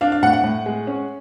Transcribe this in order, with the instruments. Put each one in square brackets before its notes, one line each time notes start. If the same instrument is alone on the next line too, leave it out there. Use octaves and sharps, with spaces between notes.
[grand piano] D4 F5
F5
A2 F#5
F#5
A2
G#3
C#4